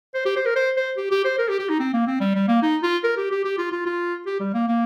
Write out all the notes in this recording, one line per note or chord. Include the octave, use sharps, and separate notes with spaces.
C5
G4
C5
A#4
C5
C5
G4
G4
C5
A#4
G4
G4
D#4
C4
A#3
C4
G3
G3
A#3
D#4
F4
A#4
G4
G4
G4
F4
F4
F4
G4
G3
A#3
A#3